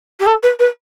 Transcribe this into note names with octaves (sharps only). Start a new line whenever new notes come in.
G4
A4
B4
B4